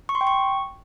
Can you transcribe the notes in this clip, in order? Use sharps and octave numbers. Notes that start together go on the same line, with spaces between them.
C#6
C6
G5
C#6